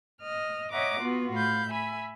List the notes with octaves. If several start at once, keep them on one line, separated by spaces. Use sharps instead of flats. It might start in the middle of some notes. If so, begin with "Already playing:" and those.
D#5 F6
C#5 D#5 E5 F#5 A#5 D6
B3 F4 F#4
A2 F5 B5 G6
E5 G#5 B5